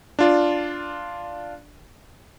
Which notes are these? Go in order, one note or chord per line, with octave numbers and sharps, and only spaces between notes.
D4 F4 D5